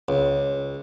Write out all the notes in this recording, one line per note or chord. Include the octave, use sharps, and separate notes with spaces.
C#2